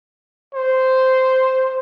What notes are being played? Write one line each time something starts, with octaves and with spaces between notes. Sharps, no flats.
C5